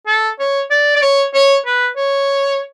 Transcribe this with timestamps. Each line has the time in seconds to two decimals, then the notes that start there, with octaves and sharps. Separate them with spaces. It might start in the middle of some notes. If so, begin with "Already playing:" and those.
0.07 A4
0.39 C#5
0.71 D5
0.96 D5
1.02 C#5
1.34 C#5
1.66 B4
1.96 C#5